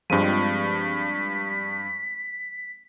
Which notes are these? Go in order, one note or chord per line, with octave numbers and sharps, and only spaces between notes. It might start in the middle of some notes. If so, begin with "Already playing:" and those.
G2 F3 G#3 C4 B6 D#7